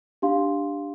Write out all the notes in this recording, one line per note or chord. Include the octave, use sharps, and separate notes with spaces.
D4 G4 F5 C6